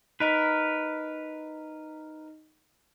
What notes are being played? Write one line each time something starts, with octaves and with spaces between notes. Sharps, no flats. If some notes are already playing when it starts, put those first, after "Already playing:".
D#4 A#4 B4 D#5 B6